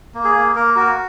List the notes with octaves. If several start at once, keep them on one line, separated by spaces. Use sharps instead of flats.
A#3
G#4
A#3
A#3 A#4
F#4 A#4